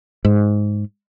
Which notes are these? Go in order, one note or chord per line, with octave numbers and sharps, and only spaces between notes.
G#2